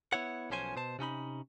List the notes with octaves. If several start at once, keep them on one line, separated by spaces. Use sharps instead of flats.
B3 E4 C#5 F#5
B1 F3 C#4 C5 G#5
B2 C5 A5
C3 C#4 D#4 B5